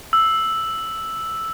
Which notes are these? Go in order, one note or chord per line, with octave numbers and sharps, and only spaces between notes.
E6